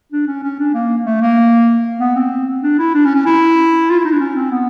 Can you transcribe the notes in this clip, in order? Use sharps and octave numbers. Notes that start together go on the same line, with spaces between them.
D4
C#4
C#4
D4
A#3
A3
A#3
B3
C4
D4
E4
D4
C#4
C#4
E4
F4
E4
D#4
D4
C#4
C4
B3